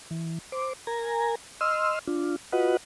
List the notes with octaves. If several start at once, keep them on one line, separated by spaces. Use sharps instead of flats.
E3
C5 D6
A#4 G#5 A#5
D#5 C6 E6 F6
D4 F4
F4 F#4 B4 D#5 F#5